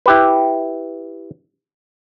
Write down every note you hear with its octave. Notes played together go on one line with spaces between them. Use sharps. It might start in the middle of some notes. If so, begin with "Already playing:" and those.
E4 G4 B4